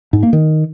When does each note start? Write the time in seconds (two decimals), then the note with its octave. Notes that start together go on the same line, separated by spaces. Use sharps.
0.13 G#2
0.23 A#3
0.33 D#3